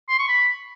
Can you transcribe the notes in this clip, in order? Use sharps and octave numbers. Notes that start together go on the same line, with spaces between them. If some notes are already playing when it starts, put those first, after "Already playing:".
C6
C#6
B5